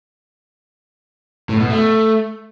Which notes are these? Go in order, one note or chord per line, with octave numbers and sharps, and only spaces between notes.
A2
B2
A3